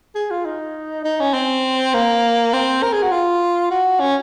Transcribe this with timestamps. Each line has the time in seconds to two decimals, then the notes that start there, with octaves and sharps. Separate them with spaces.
0.15 G#4
0.31 F4
0.45 D#4
1.05 D#4
1.20 C#4
1.34 C4
1.94 A#3
2.53 C4
2.83 A#4
2.93 G#4
3.03 F#4
3.11 F4
3.71 F#4
4.00 C#4